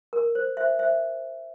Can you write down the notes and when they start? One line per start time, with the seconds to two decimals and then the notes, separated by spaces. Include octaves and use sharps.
0.13 A#4
0.35 C5
0.57 C5 E5
0.79 C5 E5